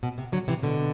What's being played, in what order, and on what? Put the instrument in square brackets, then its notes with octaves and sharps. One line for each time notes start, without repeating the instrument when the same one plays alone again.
[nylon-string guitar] B2
C3
D3 F#3
C3 E3
B2 D3